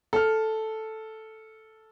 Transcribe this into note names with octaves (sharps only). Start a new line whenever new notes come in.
A4 F6